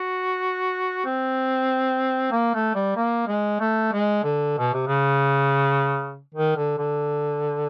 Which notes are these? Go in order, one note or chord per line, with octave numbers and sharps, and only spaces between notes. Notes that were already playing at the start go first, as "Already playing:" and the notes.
Already playing: F#4
C4
A#3
A3
G3
A#3
G#3
A3
G#3
D3
B2
C3
C#3
D#3
D3
D3